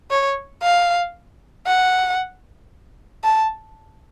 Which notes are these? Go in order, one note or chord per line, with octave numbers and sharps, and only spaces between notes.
C#5
F5
F#5
A5